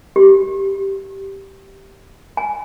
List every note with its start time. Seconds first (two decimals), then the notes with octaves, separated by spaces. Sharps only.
0.16 G4
2.37 G#5